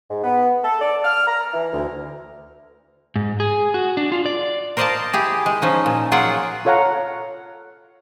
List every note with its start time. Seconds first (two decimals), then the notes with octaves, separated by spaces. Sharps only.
0.10 G#2
0.24 B3
0.64 A4
0.82 D5
1.05 F6
1.28 A#5
1.54 E3
1.73 D2
3.16 G#2
3.40 G#4
3.74 F#4
3.97 D4
4.12 F4
4.26 D5
4.77 A#4 C5 D5 D#5 F5 A5
5.13 E4 G4 G#4
5.46 G#3
5.62 F3 C#4 D#4
5.86 A#2
6.12 F#3 A#3 F4 G#4 F#5 G5
6.65 F4 A4 C#5 F5 F#5 A#5